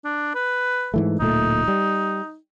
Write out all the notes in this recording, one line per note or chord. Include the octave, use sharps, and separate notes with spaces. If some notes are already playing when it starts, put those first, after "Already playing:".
D4
B4
G#2 E3 A3
D1 A#2 A3 D#4
G3